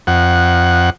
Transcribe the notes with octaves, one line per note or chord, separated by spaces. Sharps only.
F2 F#5